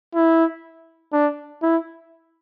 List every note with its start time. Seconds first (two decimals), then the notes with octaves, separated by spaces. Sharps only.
0.15 E4
1.13 D4
1.62 E4